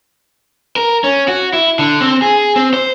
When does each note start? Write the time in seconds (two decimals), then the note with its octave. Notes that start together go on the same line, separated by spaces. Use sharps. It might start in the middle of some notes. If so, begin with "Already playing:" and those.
0.76 A#4
1.04 C#4
1.28 F#4
1.53 E4
1.79 D3
2.01 C4
2.22 G#4
2.56 C4
2.74 C5